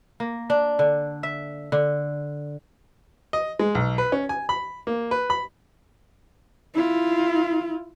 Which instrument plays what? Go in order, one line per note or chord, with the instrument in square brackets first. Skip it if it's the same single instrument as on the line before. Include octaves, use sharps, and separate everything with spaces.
[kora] A#3
D4
D3
E5
D3
[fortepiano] D#5
G#3
B1
B4
C#4
G#5
B5
A#3
B4
B5
[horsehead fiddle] E4 F4